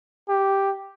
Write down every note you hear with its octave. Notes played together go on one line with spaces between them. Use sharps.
G4